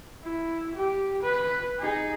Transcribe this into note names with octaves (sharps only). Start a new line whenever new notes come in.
E4
G4
B4
D#4 G#4